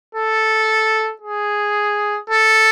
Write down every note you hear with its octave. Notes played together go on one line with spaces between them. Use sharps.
A4
G#4
A4